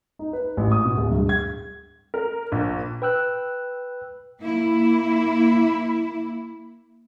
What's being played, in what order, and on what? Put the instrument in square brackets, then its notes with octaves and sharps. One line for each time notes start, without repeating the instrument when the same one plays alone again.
[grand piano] D#4
B4
A1
D#6
B2
D1
G2
G#6
[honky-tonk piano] A#4
A#1
[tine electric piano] B4 G5 E6 F#6
[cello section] A#3 E4